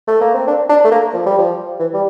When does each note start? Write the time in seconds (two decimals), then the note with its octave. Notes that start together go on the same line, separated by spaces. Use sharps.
0.08 A3
0.21 A#3
0.35 C4
0.48 D4
0.69 D4
0.85 A3
0.92 A#3
1.14 F3
1.26 G3
1.39 F3
1.80 E3
1.94 G3